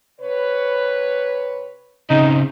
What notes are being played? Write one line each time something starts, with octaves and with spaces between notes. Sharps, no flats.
C3 B4 C#5
C#3 C4 D#4